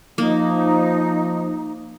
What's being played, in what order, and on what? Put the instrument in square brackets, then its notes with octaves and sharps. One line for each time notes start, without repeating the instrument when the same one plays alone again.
[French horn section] F3 [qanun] A#3 [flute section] D#4